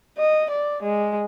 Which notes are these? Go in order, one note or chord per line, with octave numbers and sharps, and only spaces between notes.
D#5
D5
G#3